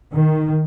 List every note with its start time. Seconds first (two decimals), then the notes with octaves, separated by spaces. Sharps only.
0.14 D#3